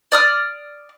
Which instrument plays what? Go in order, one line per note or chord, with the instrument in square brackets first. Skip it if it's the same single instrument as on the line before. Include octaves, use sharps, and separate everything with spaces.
[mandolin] D5 D#6 F6